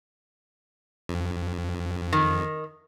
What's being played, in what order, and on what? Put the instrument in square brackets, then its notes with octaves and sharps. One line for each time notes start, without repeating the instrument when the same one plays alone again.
[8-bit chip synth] F2
[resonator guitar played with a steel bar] D#3